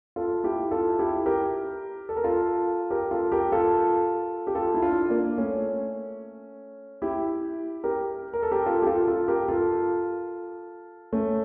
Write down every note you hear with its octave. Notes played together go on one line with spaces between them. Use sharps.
F4 A4
E4 G4
F4 A4
E4 G4
G4 A#4
A4
A#4
F4 A4
G4 A#4
F4 A4
G4 A#4
F4 A4
G4
F4 A4
E4
D4 F4
A#3 D4
A3 C#4
E4 G4
G4 A#4
A#4
A4
G4 A#4
F4 A4
G4
F4 A4
F4 A4
G4 A#4
F4 A4
A3 C#4